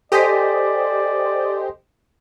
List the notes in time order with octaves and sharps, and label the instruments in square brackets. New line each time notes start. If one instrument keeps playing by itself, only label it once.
[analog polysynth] G4 C5 D#5 [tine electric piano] A4 G#5 B6 [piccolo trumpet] D5